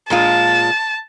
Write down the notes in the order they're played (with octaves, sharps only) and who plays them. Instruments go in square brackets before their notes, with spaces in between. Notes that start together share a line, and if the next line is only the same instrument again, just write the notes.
[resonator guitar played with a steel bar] A#2 G#3 F4 [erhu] A5